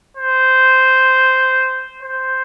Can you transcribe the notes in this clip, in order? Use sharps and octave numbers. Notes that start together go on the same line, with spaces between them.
C5
C5